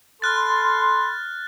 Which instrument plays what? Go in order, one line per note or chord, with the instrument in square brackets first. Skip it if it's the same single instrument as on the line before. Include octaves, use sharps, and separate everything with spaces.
[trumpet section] A4 B5 C6 [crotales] F6 F#6 A6